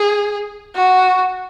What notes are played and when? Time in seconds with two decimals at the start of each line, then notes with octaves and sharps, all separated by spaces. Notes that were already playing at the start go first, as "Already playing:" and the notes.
Already playing: G#4
0.76 F#4